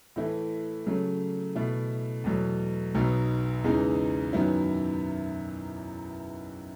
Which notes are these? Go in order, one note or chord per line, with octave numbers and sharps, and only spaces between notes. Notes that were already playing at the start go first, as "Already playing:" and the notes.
A2 E3 A3 E4
C#3 F#3 A3
B2 A3 E4
E2 B2 F#3 A3
B1 B2 F#3 B3 D#4
E2 C#3 E3 G#3 D#4
F#2 D#3 F#3 B3 E4